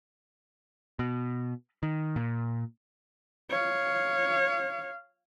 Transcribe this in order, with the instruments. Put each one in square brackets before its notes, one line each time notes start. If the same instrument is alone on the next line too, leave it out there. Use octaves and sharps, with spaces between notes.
[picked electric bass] B2
D#3
A#2
[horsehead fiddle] C#5 F5